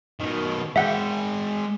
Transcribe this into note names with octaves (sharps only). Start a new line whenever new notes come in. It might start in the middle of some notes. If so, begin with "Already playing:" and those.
B2 D#3
G#3 E5 F#5 G5